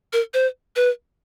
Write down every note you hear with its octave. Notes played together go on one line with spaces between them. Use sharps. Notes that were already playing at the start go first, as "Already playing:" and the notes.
A#4
C5
B4